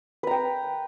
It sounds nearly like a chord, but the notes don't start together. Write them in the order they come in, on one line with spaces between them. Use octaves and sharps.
B4 A#5 G5